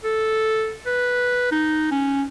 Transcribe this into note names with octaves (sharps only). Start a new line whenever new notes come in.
A4
B4
D#4
C#4